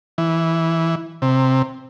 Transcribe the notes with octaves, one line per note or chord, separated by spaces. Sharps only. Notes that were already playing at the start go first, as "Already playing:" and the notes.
E3
C3